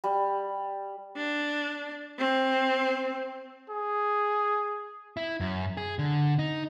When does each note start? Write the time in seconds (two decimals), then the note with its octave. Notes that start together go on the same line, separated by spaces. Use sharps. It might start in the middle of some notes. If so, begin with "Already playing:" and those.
0.04 G3
1.17 D4
2.19 C4
3.70 G#4
5.17 E4
5.40 F#2
5.77 G#4
5.99 D3
6.39 D#4